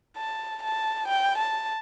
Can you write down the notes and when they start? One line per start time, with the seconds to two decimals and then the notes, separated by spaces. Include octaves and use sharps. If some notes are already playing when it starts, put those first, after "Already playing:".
0.17 A5
0.63 A5
1.08 G5
1.38 A5